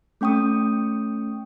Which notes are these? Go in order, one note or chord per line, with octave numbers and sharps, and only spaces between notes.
A3 C#4 G5 C#6 D#6